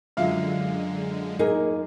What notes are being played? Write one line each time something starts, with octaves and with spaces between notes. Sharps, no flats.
F#2 D3 G#3 F4 E5 F5
A#3 D#4 G#4 A#4